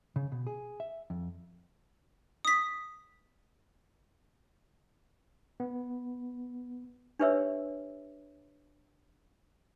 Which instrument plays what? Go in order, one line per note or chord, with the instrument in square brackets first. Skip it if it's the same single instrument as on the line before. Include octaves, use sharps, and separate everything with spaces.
[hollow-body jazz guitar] C#3
B2
G#4
E5
F2
[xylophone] D#6 B6
[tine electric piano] B3
[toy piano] D4 G4 B4 C#5 E5 E6